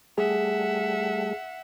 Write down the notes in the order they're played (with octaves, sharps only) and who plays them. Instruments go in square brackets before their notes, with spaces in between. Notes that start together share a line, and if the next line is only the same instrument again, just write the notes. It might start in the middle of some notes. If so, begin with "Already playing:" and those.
[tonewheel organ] G3 A3 [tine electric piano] G#4 [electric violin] E5 F#5